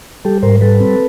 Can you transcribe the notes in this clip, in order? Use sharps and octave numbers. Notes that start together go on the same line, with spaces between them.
G3 G4 A4
G#2 A#4 C5
G3 A4 B4
C4